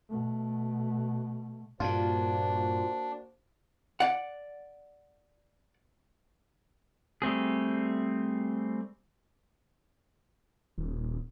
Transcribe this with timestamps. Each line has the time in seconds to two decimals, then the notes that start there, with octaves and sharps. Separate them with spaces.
0.10 B2 A3
1.80 G2 A#2 A#3 D4 F4 F#4 C5
4.00 D5 F#5
7.22 G3 A3 C4 G#4
10.78 D#1